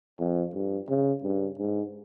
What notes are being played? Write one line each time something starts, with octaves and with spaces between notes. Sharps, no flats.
F2
G2
C#3
G2
G#2